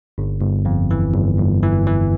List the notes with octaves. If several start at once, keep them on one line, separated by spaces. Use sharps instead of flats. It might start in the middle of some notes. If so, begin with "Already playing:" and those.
G1
G1
F2
E3
G1
G1
E3
E3